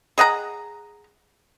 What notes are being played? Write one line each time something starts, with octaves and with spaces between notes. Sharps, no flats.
G#4 D#5 F#5 A#5